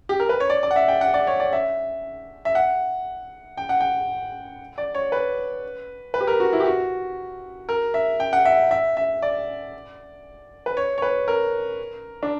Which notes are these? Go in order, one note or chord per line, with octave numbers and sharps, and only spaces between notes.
G4
A#4
B4
C#5
D5
D5
F#5
E5
G5
F#5
D5
C#5
D5
E5
E5
F#5
G5
F#5
G5
D5
C#5
B4
B4
G4
A#4
F#4
E4
G4
F#4
A#4
E5
G5
F#5
E5
E5
E5
D5
B4
C#5
C#5
B4
A#4
D4